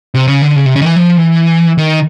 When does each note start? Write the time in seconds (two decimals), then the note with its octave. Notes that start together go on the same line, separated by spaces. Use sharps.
0.14 C3
0.27 C#3
0.42 D3
0.56 C#3
0.66 C3
0.76 C#3
0.82 D#3
0.86 E3
0.96 F3
1.17 E3
1.78 D#3